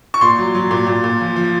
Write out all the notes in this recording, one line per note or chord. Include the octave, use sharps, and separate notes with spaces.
C#6
A#2 C6
F#3
F#3
A#2
A#2
A#2
F3
F3